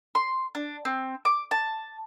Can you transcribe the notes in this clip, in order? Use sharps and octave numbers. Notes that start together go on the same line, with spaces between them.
C6
D4
C4
D6
A5